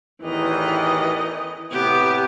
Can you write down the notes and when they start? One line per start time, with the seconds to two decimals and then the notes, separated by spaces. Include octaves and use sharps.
0.22 A1 E2 D#3 E3 D#5
1.72 A2 C3 B3 G4